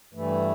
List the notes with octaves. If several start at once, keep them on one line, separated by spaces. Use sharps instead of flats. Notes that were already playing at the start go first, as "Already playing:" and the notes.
G2 E3 A3